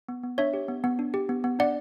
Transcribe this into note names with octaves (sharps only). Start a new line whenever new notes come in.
B3
B3
D4 C#5 E5
G4
B3
B3
D4
G4
B3
B3
D4 D5 F#5